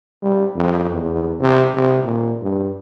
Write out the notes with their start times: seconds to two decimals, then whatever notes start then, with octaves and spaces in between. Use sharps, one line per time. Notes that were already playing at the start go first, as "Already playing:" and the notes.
0.23 G3
0.56 F2
0.92 E2
1.40 C3
1.74 C3
2.04 A#2
2.41 G2